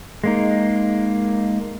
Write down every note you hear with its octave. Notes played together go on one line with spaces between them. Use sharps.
G#3 A#3 D#4